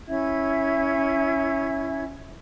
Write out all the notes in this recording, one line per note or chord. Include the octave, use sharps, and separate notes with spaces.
C#4 E4 E5 G#6